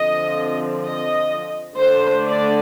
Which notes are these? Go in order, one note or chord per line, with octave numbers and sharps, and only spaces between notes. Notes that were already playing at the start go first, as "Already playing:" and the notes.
Already playing: D3 F3 C4 D#5
D#5
D3 A3 D4 C5
D5